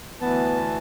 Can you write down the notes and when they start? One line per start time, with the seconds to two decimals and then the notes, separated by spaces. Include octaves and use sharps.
0.21 D2 E3 B3 A5